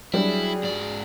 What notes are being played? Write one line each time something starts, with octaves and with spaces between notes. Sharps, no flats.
F#3 G3 D4 E4 F#4 G#4 F#7
G#2 D5